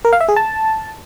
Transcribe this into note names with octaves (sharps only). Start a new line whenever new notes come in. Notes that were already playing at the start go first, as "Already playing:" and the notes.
A#4
F5
E5
G#4
A5